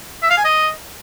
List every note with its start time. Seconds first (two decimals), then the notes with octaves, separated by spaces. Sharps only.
0.22 E5
0.30 F5
0.37 G#5
0.44 D#5